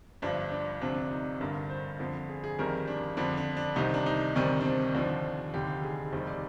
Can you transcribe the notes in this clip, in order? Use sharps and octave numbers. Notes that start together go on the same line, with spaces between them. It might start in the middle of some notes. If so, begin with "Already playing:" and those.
G1 G2 F3 D4
D4
D2 C3 F3 D4
D4
D#4
G1 G2 D3 A#4
C5
F2 D3 F3
G#4
G#4
G1 F2 D#3 G3 A#4
D4
F2 D3 F3 D4
D4
D4
C2 C3 D#3 G3 D#4
D4
D#4
D2 C3 D#3 G3 D4
D4
C4
D#2 D3 F3 D4
F1 D#2 D3 G4
G#4
F1 D#2 D#3 G3 C5
D5